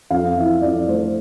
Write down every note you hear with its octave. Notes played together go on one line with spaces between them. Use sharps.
F2 F5
E3 E5
F2 D5
A3 C5